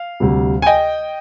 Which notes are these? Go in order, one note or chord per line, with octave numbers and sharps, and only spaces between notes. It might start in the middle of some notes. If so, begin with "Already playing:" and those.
Already playing: F5
D2 C3 G3
G#5
D#5 G5